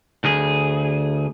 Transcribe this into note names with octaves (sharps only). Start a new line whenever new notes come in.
D2 G#4